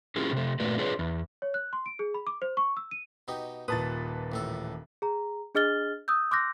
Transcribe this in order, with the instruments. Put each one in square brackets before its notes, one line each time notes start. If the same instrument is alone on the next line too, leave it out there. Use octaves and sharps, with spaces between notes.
[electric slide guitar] C#4 E4 F4 G4 G#4
C3 A3
A#2 A3 F#4 B4 D5
D4 F4 G#4 B4 C#5 D#5
E2
[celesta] C#5
F#6
C6
D7
G#4
B5
D6
C5
C#6
E6
D#7
[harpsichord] B2 D#4 G4
[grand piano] D#1 A#2 [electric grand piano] B4 A5 A6 [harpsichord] D#6
[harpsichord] A1 A2 A4
[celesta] G#4 A#5
D4 G#4 D#5 F6 A6 G7
D#6 E6 G6
C6 D6 E6 F#6 G6 A#6